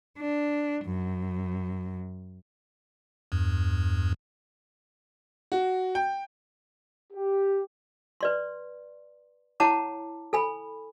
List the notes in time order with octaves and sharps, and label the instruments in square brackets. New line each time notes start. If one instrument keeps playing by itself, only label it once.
[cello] D4
F#2
[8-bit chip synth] E2 G2
[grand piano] F#4
G5
[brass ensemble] G4
[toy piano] B4 D5 C6
E4 C#5 F#5 A5 A#5 D6
A4 G#5 B5